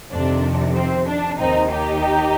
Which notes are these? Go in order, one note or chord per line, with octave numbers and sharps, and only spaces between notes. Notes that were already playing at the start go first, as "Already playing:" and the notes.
F2 C3 D#3 D4
C4
D4
D#2 D#3 C4 D#4
D#4 G4